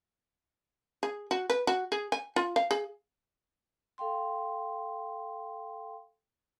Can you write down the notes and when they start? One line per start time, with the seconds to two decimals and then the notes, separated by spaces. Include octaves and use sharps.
1.03 G#4
1.31 F#4
1.50 B4
1.67 F#4
1.92 G#4
2.12 G#5
2.36 F4
2.56 F5
2.71 G#4
3.98 A4 F5 G5 C6